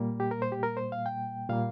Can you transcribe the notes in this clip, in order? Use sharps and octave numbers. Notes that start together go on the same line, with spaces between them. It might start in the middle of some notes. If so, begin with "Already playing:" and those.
Already playing: A#2 G3 A#3
G4
A#4
C5
G4
A#4
C5
F5
G5
A#2 G3 A#3 F5